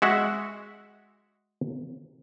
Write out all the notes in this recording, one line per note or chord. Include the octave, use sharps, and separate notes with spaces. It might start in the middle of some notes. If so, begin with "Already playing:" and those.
G#3 F#4 E5 F#5